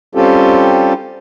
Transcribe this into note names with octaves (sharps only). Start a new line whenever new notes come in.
G3 C4 C#4 F4 G4 A4